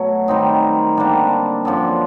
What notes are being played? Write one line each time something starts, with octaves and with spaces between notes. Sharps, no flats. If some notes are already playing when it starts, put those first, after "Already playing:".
Already playing: B2 F#3 A3
D#3 G3 C4 D#4
D3 G3 A#3 D4
F#2 D3 F3